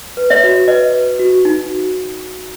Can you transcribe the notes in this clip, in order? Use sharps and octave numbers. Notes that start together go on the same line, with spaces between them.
B4
C#5 E5
F#4
B4 D#5
B4
F#4
D#4
F#4